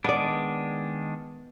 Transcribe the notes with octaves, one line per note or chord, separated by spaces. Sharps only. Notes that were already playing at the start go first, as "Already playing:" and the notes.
D#3 G#3 B3 D4 D5